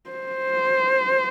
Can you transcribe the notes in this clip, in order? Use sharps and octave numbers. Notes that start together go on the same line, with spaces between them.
C5